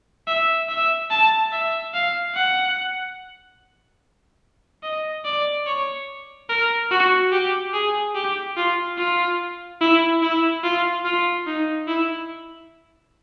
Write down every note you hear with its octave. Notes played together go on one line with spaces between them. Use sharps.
E5
E5
A5
E5
F5
F#5
D#5
D5
C#5
A#4
F#4
G4
G#4
G4
F4
F4
E4
E4
F4
F4
D#4
E4